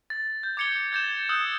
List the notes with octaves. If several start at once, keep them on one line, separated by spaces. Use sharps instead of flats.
A6
G6
D6 G#6 C#7 F7 G7
G6 A6 E7
D#6 E6 F#6 G6